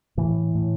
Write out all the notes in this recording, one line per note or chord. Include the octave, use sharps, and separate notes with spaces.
A2 E3
A2